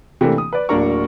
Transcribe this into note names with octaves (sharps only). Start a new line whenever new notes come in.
C3 E3 A3 A#3 D4
D#6
B4 D5
D1 A#3 D4 A#4 A#5 C#6